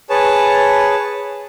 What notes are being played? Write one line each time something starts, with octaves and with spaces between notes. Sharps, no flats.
G#4 B4 C#5 A5